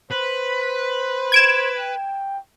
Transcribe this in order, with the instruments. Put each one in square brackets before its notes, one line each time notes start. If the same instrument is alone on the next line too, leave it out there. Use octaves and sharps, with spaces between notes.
[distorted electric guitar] B4 [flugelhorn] C5
[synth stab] G#6 D7 E7
[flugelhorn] G5